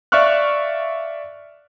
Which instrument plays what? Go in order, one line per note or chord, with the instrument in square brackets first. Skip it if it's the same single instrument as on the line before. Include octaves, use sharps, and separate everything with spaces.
[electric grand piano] D5 E5 F5 C#6 F6 F#6